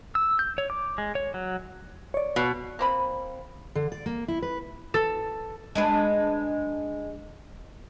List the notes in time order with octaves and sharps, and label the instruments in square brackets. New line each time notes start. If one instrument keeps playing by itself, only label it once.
[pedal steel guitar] E6
G6
C#5
D6
G#3
C#5
F#3
[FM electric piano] C#5 D5
[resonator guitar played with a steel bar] B2
[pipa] A#3 C4 B5
[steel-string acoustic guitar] D3
D5
A#3
E4
B4
[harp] A4
[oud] G#3 D4 B4